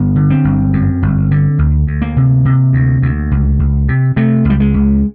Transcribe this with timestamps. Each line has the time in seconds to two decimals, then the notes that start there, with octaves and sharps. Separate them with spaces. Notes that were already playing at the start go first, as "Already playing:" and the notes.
Already playing: G1 B3
0.16 D3
0.30 C4
0.44 G1
0.73 F#2
1.02 G1
1.31 D3
1.59 D2
1.87 D2
2.02 A#3
2.16 C3
2.45 C3
2.73 D2
3.02 D2
3.31 C#2
3.59 C#2
3.89 C3
4.16 C3 A3
4.45 C#2 G3
4.60 G#3
4.74 C#2